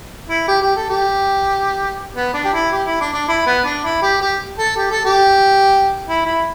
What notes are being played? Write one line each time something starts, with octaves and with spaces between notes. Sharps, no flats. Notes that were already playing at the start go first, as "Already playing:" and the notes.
E4
G4
G4
A4
G4
B3
D4
G4
E4
G4
E4
D4
D4
E4
B3
D4
E4
G4
G4
A4
G4
A4
G4
E4
E4